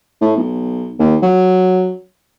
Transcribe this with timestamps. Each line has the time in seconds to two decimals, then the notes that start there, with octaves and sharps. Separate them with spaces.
0.22 A2
0.36 B1
0.99 D#2
1.23 F#3